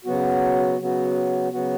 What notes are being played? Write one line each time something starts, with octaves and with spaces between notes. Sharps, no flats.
C#3 F#3 B3 F#4
C#3 F#3 B3 F#4
C#3 F#3 B3 F#4